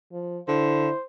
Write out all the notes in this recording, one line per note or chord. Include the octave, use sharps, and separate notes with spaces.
F3
D3 E4 C5